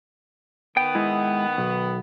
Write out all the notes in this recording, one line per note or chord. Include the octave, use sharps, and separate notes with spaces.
D#3 B3 G5
G#3 E4
B1